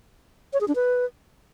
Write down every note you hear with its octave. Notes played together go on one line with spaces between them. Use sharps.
C#5
G#4
D4
B4